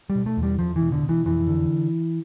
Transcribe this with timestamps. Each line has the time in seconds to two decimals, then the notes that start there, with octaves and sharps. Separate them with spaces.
0.10 G3
0.15 B2
0.26 A3
0.37 E2
0.43 G3
0.59 E2 F3
0.76 E3
0.81 B2
0.92 D3
1.03 B2
1.09 E3
1.25 F2 E3
1.47 D3